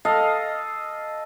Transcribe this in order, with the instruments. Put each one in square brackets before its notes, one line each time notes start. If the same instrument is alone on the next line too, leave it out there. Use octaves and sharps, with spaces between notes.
[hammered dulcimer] A4 D#5 F5